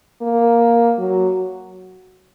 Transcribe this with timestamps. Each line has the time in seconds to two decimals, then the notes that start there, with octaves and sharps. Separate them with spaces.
0.22 A#3
0.99 F#3